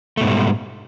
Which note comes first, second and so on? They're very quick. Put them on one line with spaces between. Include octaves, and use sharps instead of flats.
A3 B2 G#2 G3